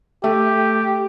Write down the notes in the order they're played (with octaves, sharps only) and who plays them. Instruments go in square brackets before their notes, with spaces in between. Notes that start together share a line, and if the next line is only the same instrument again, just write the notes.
[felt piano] A3 [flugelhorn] G4